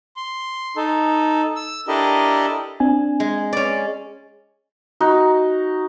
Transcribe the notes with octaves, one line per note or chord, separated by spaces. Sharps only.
C6
D#4 A4
E6
D4 E4 G4 A4 A#4 D#5
C4 D4 G#5
G#3
C#4 D5
D#4 F#4